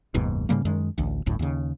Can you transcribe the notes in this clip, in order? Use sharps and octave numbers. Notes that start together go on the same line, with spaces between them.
F#1 D#2 G#2 B2
G#2 C#3 G3 A#3
F#2 D#3 G#3
A1 D2
G1 D2 A2
D#2 C#3